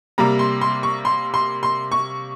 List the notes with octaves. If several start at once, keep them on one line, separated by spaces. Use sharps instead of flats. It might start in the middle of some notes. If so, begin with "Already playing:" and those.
C3 G3 A#3 A#5
C6
C6
C#6
C6
C6
C6
C#6